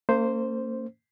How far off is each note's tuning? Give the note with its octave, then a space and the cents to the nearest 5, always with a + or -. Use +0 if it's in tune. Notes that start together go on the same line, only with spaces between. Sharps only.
A#3 -40 C#4 +0 C5 +0